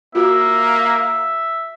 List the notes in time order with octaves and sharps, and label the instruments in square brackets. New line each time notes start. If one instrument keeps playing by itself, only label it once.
[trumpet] A#3 [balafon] F4 F#4 [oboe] E5